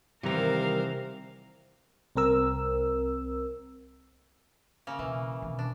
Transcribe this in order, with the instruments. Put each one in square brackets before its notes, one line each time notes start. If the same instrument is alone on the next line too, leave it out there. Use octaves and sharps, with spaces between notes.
[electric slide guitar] C3 E3 A#5 [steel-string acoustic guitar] D#3 G3 [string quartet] A#4 C5 F5
[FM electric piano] C2 C4 A#4 E6
[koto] C#3 A#3
[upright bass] B2 [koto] E3
[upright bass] B2 D#3
[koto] D4